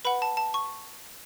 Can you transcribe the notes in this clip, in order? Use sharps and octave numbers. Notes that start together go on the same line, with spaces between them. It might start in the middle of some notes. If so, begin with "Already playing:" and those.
B4 F#5 B5
A5
A5
C#6